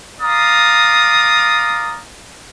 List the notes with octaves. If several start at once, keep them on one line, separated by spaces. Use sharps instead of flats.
D5 F5 A#5 D#6